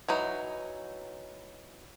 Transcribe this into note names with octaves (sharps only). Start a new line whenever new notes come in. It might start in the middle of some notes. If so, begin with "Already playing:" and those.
E3 F#3 D#4